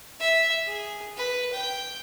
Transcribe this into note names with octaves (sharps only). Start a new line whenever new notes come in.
E5
G#4
B4
G5